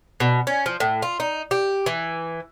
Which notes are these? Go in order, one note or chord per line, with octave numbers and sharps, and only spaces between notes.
B2
C#4
F3
A2
F4
D#4
G4
E3